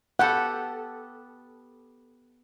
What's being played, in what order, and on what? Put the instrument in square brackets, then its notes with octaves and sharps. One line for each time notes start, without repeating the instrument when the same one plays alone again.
[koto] B3 G4 A4 [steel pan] F#5